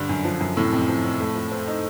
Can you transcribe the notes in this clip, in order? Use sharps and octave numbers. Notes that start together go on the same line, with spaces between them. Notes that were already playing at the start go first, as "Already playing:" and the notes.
Already playing: G2 D3
F#2
F3
F#2
A2 C3
F2
F3
F2
A3
F3
C4
D#4